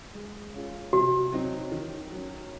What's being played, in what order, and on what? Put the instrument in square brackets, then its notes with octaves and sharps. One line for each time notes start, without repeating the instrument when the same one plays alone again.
[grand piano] G#3
C#4 F4 G#4
[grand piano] C3 [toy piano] F#4
[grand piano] F#3 C4 D#4
D#3
F#3 C#4